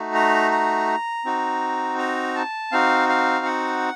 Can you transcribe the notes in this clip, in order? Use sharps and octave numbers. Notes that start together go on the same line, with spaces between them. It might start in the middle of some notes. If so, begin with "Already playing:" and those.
Already playing: A3 D#4 F#4
A#5
A#5
C4 D#4 F#4
A#5
A5
C4 D#4 F#4 F5
F5
F#5